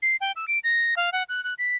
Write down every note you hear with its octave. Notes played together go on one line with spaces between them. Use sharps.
C7
G5
E6
D7
A#6
F5
F#5
F#6
F#6
B6